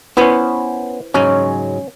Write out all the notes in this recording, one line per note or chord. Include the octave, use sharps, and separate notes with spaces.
B3 C#4 E4 B4 C5
G#2 C#3 F#3 C#4